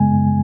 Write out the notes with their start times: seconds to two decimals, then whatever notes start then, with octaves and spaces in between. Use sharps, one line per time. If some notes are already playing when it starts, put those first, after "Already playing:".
Already playing: F#2 C#3 G#3 B3 G#5
0.12 F#2